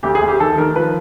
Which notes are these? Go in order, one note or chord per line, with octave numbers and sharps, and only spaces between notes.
D2 G4
G#4
D2
G4
D#3 A4
D#3 A#4
F3 B4